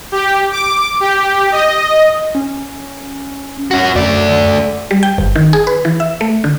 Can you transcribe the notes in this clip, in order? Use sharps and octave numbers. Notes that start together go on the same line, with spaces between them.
G4
D6
G4
D#5
C#4
C#4 F#4
F#2 A3 D5
G3
G5
G1
D#3
G#4
B4
E3
E5
A3
D3